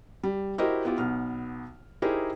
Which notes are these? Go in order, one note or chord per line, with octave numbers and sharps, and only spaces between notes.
G3
E4 F#4 G4 A#4 C5 D#5
B3 E4 F4 G4
B1 B3 F6
D#4 E4 G4 G#4 A#4 C5